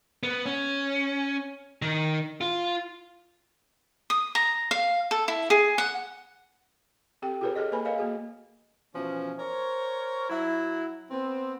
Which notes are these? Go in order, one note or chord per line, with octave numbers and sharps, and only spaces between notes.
B3
C#4
D#3
F4
D#6
A#5
F5
A4
E4
G#4
F#5
C4 G4 A4 G5
F4 G4 G#4 A#4 B4 C#5
G#4 A4 C#5 D#5
A#3 B4 G#5 B5
A#4 C#5 D#5 F5 G#5
A#3 F#4 G#4
B2 E3 F3 C#4
A#4 C5 C#5
F#3 E4
B3 C4